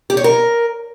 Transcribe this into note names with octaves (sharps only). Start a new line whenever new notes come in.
G4
C#5
A#4